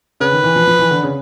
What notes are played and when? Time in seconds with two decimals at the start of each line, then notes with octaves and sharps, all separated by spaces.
0.20 C#3 B4
0.32 D#3
0.43 E3
0.56 F3
0.67 F3
0.79 E3
0.91 D3
1.03 C#3